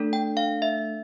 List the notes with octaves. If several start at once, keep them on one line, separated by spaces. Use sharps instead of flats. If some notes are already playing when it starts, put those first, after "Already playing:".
Already playing: A3 D4 A4
G5
F5
E5